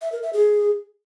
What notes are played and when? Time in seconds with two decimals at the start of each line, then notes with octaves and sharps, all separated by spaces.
0.02 E5
0.12 A#4
0.23 E5
0.33 G#4